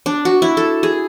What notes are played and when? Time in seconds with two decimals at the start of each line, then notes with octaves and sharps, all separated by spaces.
0.06 D4
0.25 F#4
0.42 E4
0.57 A4
0.83 G#4